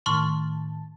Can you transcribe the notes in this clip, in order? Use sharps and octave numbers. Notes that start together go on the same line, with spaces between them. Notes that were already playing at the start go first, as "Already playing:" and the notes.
A2 D#3 A5 C6 C#6 F6